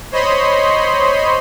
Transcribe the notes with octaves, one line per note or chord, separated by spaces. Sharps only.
C5 C#5 D#5 B5 C6